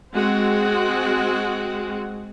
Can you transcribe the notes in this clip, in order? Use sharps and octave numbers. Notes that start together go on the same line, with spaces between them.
G#3 C4 F#4